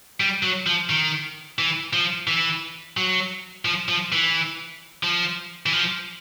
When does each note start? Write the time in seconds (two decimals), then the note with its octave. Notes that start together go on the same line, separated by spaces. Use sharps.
0.20 G3
0.43 F#3
0.67 F3
0.90 D#3
1.59 E3
1.93 F3
2.27 E3
2.97 F#3
3.65 F3
3.89 F3
4.12 E3
5.03 F3
5.66 E3
5.73 F3